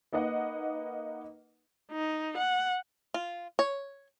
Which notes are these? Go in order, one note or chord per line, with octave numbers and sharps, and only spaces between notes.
A#3 D#4 B4 D#5 F#5
D#4
F#5
F4
C#5